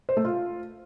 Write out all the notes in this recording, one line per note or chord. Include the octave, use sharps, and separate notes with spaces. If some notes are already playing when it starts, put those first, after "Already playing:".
C5
A3
F4